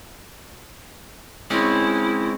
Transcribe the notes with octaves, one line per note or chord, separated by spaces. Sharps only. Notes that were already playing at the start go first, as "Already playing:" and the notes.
G#3 C4 C#4 E4